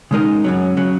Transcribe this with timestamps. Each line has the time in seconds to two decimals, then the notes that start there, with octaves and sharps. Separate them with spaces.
0.11 C#3 G#3 D#4 A#4 D#5
0.44 F#2 C#3 F#3
0.77 C#3 F#3